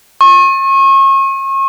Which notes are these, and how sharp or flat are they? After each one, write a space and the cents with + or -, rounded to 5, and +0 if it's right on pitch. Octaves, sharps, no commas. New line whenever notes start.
C#6 -35